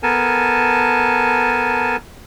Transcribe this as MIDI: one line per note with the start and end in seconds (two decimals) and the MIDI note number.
0.03 1.97 59
0.03 1.97 69
0.03 1.97 70
0.03 1.97 80
0.03 1.97 81